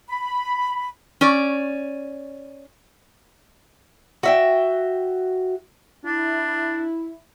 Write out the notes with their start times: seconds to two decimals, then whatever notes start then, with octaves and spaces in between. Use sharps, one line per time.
0.10 B5
1.21 C#4 D5
4.23 F#4 E5 G5
6.05 D4 E4